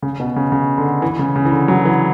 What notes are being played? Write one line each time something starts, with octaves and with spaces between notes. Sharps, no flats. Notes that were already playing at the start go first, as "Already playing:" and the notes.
C#3
B2
C#3
C#3
D3
E3
C#3
C#3
E3
D3
F#3
E3